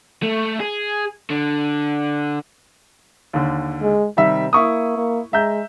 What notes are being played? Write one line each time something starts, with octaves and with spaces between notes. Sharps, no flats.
A3
G#4
D3
D#2 D3
G#3
C3 D#3 G3 E5
A#3 E4 C#6 D#6
A#3
G#3 E5 A#5 G6